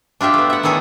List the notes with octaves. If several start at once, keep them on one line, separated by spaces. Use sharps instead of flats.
D4 F4 G4 E5
A3 B3
E5 F#5
D#3 B3 E4 G#4 A4 C#5